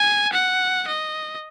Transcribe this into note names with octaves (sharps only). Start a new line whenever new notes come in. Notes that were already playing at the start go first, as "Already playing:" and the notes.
Already playing: G#5
F#5
D#5